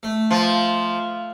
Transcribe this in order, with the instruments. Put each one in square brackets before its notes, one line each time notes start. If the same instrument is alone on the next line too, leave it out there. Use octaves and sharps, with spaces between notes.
[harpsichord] A3
[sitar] F3